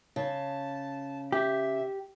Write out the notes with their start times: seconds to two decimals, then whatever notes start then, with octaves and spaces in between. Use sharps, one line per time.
0.16 C#3 A5
1.32 G4 E5